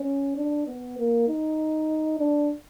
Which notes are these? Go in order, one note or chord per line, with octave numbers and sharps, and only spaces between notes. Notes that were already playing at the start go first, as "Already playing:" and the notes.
Already playing: C#4
D4
B3
A#3
D#4
D4